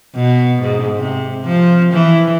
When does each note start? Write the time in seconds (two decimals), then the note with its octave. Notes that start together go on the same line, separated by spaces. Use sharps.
0.15 B2
0.62 G#2
0.97 C3
1.43 F3
1.92 E3